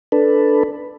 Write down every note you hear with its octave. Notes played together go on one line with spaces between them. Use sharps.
D4 A4 B4